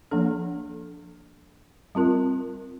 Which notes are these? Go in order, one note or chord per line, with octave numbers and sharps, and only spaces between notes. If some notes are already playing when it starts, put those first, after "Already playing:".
F3 A#3 D4 A4
G3 C4 F4 A#4